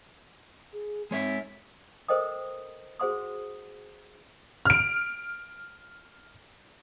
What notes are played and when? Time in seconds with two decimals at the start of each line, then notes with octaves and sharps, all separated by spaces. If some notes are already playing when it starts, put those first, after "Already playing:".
0.73 G#4
1.11 G#3 C4 C#5 E5
2.08 A4 A#4 C5 D#5 G5 D#6
3.00 F#4 G#4 C5 F#5 C6 D#6
4.65 F6 D7